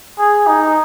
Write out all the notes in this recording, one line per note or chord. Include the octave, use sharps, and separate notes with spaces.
G#4
D#4